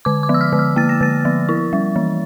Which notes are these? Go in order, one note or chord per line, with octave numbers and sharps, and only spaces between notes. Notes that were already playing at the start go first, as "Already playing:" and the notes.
D3 D6
D6
F3
E6
F6
D3
F6
A#3 A6
A#6
D3 A6
F3
E4
G3
E3